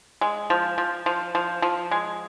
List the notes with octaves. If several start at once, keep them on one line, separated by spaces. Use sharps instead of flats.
G#3
F3
F3
F3
F3
F3
G#3